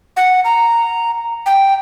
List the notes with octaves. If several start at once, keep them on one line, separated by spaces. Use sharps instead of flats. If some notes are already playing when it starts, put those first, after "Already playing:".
F#5
A#5
G5